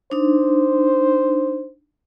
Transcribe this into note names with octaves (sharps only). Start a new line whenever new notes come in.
D4 D#4 C5